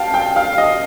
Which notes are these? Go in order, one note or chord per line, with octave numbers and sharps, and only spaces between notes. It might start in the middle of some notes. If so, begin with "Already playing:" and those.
Already playing: F5 G5 A5
G5
F5
D#5